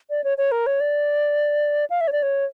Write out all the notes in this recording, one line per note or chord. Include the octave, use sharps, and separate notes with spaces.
D5
C#5
C#5
A#4
C#5
D5
F5
E5
C#5
D5
C#5